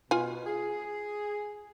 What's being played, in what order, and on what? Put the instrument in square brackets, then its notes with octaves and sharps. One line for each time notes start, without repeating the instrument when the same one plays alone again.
[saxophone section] B2 [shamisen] F4 G#5
[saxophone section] G#4